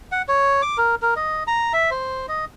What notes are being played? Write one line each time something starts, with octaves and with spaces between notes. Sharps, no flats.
F#5
C#5
D6
A#4
A#4
D#5
A#5
E5
C5
D#5